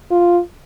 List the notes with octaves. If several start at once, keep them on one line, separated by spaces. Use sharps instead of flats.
F4